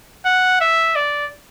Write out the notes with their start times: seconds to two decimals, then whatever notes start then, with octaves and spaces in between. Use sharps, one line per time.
0.25 F#5
0.61 E5
0.95 D5